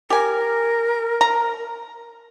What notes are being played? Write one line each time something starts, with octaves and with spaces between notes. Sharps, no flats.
G4 A#4 G#5
A#5